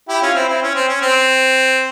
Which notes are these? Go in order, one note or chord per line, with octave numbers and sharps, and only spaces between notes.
E4 G4
C#4 F4
C4 E4
C4 E4
C#4
C4
C#4
C4